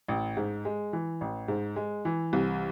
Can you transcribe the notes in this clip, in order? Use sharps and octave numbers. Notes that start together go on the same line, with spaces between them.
A1
G#2
G#3
E3
A1
G#2
G#3
E3
C2